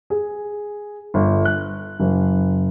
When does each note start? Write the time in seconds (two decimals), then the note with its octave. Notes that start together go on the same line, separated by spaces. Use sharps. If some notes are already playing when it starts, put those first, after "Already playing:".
0.10 G#4
1.14 G1
1.45 F#6
2.00 F#1